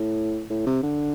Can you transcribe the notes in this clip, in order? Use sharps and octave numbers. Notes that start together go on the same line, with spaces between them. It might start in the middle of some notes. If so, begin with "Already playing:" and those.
Already playing: A2
A2
C3
D3